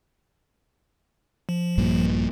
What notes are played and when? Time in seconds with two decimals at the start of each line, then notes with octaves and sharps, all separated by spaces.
1.49 F3
1.78 A#1 G2 A#2